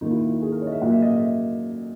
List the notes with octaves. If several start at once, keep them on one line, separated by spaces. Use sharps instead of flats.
D#2 D#3 A#3 D#4
E4
F#4
G#4
A#4
C#5
D#5
E5
A#2 F#3 A#3 F#5
E5
D#5
E5